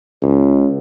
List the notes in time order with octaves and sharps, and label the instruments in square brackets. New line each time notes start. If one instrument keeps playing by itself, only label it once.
[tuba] C#2